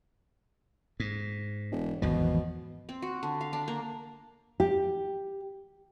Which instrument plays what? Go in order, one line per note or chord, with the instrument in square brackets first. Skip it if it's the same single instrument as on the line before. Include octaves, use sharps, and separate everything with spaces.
[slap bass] G#2
[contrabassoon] E1
[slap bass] G#1 E2 F3 [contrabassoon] B2
[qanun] C4
F#4
D3
F5
D4
A#3
[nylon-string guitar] G4